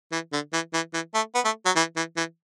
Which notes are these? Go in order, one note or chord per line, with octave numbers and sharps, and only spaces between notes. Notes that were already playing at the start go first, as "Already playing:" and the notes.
E3
D3
E3
E3
E3
A3
B3
A3
F#3
E3
E3
E3